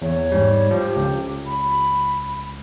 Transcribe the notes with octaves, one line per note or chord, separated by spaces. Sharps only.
E2 C#5
G#2 G3
F3 G4
C#2
B5